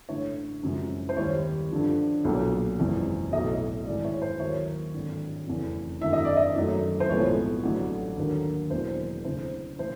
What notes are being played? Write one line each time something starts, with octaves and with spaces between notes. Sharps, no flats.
A1 G2 D3 C#5
F#2 C#3 F3 G#3
C5
D#2 D#3 G3 C#5
G2 D3 F3
B1 A#2 F#3
F#1 E2 C3 F3 G#3
B1 A2 F#3 D#5
G#1 G#2 E3 G#3 D5
C#5
C5
D#2 D#3 F#3 A#3 C#5
G#1 G2 D3
F1 E2 C#3
G#1 F#2 D3 E5
D#5
D5
D#5
F#2 D#3 F#3 A3
C5
B1 A2 F3 G#3 B3 C#5
A1 G2 D3 F#3 A3
D#2 D3 F#3 A#3
E1 E2 B2 F#3 A#3 C5
D2 C#3 E3 C5
A#2 F3 C5